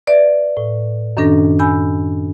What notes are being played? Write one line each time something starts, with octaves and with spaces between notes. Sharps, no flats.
B4 D5 E5
A2
F#2 D#3 C#4 D4 A4 A#6
G#5 B5 E6 G6